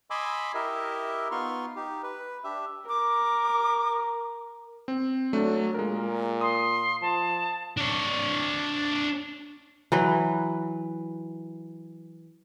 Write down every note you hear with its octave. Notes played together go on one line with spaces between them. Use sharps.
D#5 G#5 B5 C6 D6 E6
E4 G4 A#4 D#5 E5
B3 D#4 F4 C6 C#6 F6
D#4 G4
B4
D4 G4 E5
A#4 D6
C4
F#3 A3 D4
A#2 G#3 A#4
C6 D#6
F3 A5
D4 C#5
E3 F#3 B4